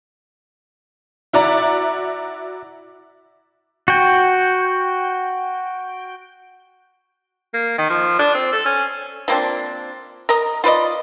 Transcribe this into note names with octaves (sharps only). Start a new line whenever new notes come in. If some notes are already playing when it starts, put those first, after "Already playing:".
E4 F#4 D5 A#5
F#4 G5
A#3
D#3
F3
D4
C4
A4
C#4
F3 A#3 C4 D4
A#4 D#5 A#5
F4 B4 D5 D#5